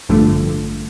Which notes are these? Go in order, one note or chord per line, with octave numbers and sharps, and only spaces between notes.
A1 G2 D3 F3 A3